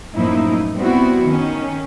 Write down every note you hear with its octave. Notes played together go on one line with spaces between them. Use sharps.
F#2 A2 F3 A#3 D#4 E4
G3 B3 C4 E4 F#4
D#3 C#4